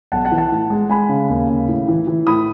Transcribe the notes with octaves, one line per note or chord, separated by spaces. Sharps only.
B1 F#5 A5
F#5 A5
E3
F#5 A5
A2
G#3
G#3 G#5 B5
C#3
D#2
C#3
A2
E3
E3
A2 B5 D#6